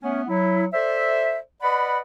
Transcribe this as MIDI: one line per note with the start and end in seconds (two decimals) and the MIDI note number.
0.03 0.23 57
0.03 0.23 59
0.03 0.23 61
0.28 0.66 54
0.28 0.66 64
0.73 1.39 69
0.73 1.39 72
0.73 1.39 74
0.73 1.39 76
1.62 1.98 71
1.62 1.98 74
1.62 1.98 75
1.62 1.98 78
1.62 1.98 83